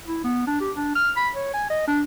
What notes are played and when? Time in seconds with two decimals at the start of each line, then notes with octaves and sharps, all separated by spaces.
0.08 E4
0.24 B3
0.47 D4
0.60 G4
0.76 D4
0.95 F6
1.17 B5
1.35 C#5
1.54 G#5
1.70 D#5
1.87 D4